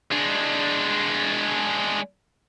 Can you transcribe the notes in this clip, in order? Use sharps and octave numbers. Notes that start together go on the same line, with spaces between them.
G#3 D4